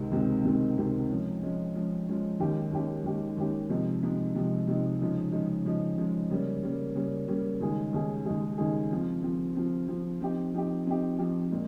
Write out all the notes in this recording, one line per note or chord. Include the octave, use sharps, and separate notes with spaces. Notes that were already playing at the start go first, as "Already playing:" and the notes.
Already playing: C#2 C3 D#3 G#3 C4
C#2 C3 D#3 G#3 C4
C#2 C3 D#3 G#3 C4
C#2 C3 D#3 G#3 C4
F3 G#3 C#4
F3 G#3 C#4
F3 G#3 C#4
F3 G#3 C#4
D#2 D#3 G#3 C#4 G4
D#2 D#3 G#3 C#4 G4
D#2 D#3 G#3 C#4 G4
D#2 D#3 G#3 C#4 G4
C3 F3 G#3 D#4
C3 F3 G#3 D#4
C3 F3 G#3 D#4
C3 F3 G#3 D#4
C#3 F3 G#3 D#4
C#3 F3 G#3 D#4
C#3 F3 G#3 D#4
C#3 F3 G#3 D#4
C#3 G3 A#3 C#4
C#3 G3 A#3 C#4
C#3 G3 A#3 C#4
C#3 G3 A#3 C#4
D#2 C#3 G#3 D#4 G#4
D#2 C#3 G#3 D#4 G#4
D#2 C#3 G#3 D#4 G#4
D#2 C#3 G#3 D#4 G#4
F3 C4 F4
F3 C4 F4
F3 C4 F4
F3 C4 F4
F3 C4 D#4 G4
F3 C4 D#4 G4
F3 C4 D#4 G4
F3 C4 D#4 G4
A#2 G#3